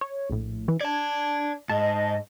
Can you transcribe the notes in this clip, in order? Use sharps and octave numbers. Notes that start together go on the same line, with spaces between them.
C#5
A#1 A2
E3
D4 D5 A5 G#6
G#2 D#5 A5